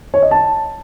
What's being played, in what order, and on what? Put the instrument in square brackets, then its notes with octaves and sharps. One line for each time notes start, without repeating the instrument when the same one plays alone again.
[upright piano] C#5
D#5
A5